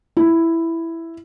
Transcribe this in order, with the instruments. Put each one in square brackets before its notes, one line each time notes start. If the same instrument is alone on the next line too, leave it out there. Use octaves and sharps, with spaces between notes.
[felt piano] E4